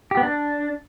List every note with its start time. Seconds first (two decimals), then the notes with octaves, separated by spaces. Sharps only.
0.11 G4
0.17 B3
0.23 D4